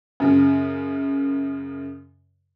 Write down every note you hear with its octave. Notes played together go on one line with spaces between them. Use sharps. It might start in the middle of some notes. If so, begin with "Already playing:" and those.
F#2 C#3